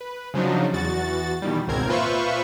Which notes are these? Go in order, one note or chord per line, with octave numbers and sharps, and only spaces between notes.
B4
C#3 F3 F#3 D4 D#4
E2 F#4 A6
B2 D#3 E3 G3
G#1 C#2 B2 C4 A#4 G#6
A#2 F4 B4 C5 E5 C#6